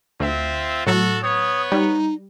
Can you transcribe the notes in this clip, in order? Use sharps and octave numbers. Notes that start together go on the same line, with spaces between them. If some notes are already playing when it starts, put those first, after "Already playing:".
D2 C4 F4 E5
A2 F#3 F#4 A4
B3 C#5 D#6
G3 D#4